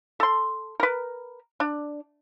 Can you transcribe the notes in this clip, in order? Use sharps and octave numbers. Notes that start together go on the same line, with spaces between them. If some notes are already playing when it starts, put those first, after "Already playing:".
A4 C6
A#4 B4
D4